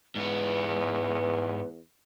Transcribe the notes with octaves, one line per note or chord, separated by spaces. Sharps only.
E2 G#2 B3 B4